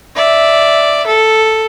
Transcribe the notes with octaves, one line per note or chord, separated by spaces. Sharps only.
D5 E5
A4